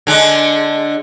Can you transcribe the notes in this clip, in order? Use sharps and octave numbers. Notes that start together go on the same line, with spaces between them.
D3 G#3 D4